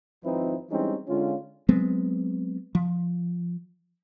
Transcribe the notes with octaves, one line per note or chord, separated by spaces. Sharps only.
G#1 F3 C4 D#4 E4 B4
E3 G3 G#3 C4 C#4 D#4
D3 G#3 C#4 F4
F#3 G#3 B3 C4
F3